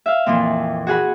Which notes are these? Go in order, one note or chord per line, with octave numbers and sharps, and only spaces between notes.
E5 F5
F2 A#2 E3 F3 C4
F#4 G#4 F#5 B5